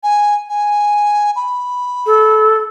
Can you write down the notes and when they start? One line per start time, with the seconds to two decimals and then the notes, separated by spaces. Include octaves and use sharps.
0.03 G#5
0.49 G#5
1.36 B5
2.06 A4